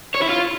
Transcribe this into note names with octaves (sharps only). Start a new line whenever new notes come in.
C#5
E4
F4